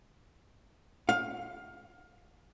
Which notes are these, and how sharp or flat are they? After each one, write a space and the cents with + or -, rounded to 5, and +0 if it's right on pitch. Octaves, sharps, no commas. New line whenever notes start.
F5 +15